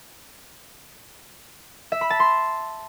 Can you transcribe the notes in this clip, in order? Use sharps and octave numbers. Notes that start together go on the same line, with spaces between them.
E5
B5
A5
C6